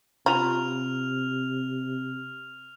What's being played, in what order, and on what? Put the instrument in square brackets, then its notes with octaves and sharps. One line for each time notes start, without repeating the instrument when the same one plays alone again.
[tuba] C3 [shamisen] F4 A#5 B5 [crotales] F6 F7